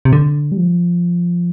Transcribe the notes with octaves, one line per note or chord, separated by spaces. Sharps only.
C3
D3
G3
F3